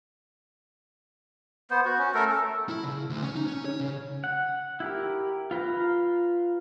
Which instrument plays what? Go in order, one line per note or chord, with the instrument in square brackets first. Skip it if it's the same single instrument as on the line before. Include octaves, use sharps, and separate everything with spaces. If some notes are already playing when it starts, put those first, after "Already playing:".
[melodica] B3 C5
F#4
C#4
A3 A4 A#4
A4
[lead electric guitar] E4
C#3
D2
C#4
D#4
C#4
C#5
C#3
[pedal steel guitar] F#5
E4 G4 A#4
F4 B4 F5 A#5